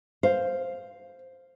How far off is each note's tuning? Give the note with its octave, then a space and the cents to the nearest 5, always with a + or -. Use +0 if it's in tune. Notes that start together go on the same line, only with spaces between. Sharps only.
C5 +0 F5 +0